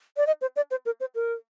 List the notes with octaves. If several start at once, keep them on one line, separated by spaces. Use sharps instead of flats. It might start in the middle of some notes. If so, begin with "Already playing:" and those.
D5
D#5
C5
D5
C5
A#4
C5
A#4